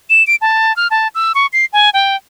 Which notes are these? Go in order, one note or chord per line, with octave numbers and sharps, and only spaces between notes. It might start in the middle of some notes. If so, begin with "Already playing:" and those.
E7
D7
A5
F6
A5
E6
C#6
C7
G#5
G5